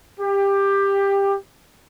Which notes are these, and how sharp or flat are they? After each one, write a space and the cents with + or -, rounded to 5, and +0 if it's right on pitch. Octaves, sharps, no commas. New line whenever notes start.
G4 +15